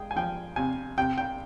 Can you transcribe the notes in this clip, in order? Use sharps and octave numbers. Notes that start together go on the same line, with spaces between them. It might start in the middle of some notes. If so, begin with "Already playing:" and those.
Already playing: G#3 G#4 G5
G#5
F3 G5
C3 G#5
C3 G5
G5